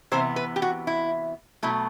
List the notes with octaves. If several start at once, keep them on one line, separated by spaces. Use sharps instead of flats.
C3 E3 B3 C5
B4
G4
F#4
E4
B2 F#3 A3 E4